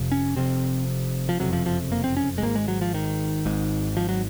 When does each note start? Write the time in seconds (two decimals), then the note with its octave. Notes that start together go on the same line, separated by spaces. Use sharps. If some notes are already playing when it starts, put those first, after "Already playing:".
Already playing: F1 F2 C3
0.12 C#4
0.36 F1 F2 C3 C4
1.29 F3
1.40 F#1 F2 C3 F#3
1.53 F3
1.66 F3
1.92 A#3
2.04 C4
2.17 C#4
2.38 G#3
2.42 G#1 G#2 A#3
2.55 G#3
2.68 F#3
2.81 F3
2.94 D#3
3.45 G#1 G#2
3.97 F3
4.09 F#3